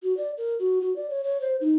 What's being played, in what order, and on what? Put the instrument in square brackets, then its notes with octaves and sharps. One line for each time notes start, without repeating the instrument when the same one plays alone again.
[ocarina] F#4
D5
A#4
F#4
F#4
D5
C#5
C#5
C5
D#4